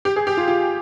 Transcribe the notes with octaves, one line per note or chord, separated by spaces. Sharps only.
G4
G#4
G4
F4
F4